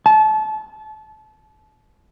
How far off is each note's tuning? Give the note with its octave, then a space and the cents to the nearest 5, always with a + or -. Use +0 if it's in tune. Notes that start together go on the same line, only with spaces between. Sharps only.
A5 -30